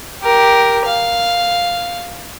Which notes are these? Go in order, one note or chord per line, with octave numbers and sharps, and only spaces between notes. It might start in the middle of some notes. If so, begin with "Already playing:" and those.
G4 A#4
F5